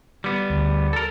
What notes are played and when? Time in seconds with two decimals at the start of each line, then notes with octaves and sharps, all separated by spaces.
0.24 G3 B3
0.50 D2
0.93 A4 A#4